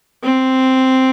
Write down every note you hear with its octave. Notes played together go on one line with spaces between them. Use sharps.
C4